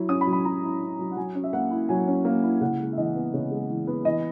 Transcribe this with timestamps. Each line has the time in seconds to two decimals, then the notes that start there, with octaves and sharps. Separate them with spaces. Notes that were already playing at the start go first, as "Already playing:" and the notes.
Already playing: F#3 E4
0.09 C#4 D#6
0.21 B5
0.27 F#3
0.33 B5
0.45 F#3 A#5
0.63 E4
0.81 C#4
0.99 F#3
1.11 F#5
1.17 F#3 G#5
1.35 C#4
1.44 E5
1.53 A#3 F#5
1.71 E4
1.89 F#3 G#5
2.07 C#4
2.25 A#3
2.44 E4
2.61 C#3 F#5
2.79 G#3
2.93 E5
2.97 E3 D#5
3.15 B3
3.33 C#3 C#5
3.51 G#3
3.69 E3
3.87 B3
4.05 E3 D#5